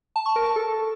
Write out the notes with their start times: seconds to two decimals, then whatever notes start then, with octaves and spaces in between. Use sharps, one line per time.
0.16 A5
0.26 C#6
0.36 A#4
0.46 A5
0.56 A4